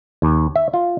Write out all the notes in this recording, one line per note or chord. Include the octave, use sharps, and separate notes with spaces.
D#2
E5
F4